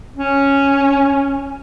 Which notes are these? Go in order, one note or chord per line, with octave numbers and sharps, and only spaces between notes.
C#4